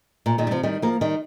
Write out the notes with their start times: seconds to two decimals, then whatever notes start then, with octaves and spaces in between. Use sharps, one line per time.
0.26 A#2
0.38 A#2 D#3
0.47 G3
0.51 C3 F3
0.63 D#3 G3
0.82 F3 A#3
1.01 D#3 G3